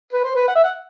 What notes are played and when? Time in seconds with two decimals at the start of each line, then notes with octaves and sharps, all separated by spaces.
0.13 B4
0.24 C5
0.36 B4
0.48 F#5
0.55 E5
0.64 F#5